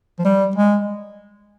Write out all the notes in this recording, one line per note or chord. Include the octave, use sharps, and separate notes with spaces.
F3
G3
G#3